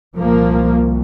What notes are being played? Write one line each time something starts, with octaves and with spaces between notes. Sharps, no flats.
C2 A#2 F3 A#3